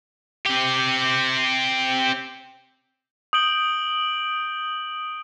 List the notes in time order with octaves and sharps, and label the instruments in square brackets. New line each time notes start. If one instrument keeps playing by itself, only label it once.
[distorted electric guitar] C4 G4
[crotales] D#6 G6 D7 F#7 G7